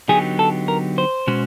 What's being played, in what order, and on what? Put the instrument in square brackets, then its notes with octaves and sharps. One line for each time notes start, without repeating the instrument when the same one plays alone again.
[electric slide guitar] D3 F#3 B3 D#4 G4 [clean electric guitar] G#4
[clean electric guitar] A4
A#4
C5
[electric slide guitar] B2 G#3 C#4 F#4